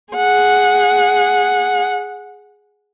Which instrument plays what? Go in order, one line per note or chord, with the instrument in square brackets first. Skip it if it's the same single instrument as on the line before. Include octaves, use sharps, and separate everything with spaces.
[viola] G#4 F#5